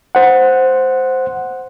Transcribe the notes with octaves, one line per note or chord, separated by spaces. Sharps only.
C5 F#5